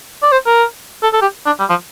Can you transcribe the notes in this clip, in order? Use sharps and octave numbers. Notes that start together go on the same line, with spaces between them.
D5
C5
A#4
A4
A4
G4
D4
G3
F3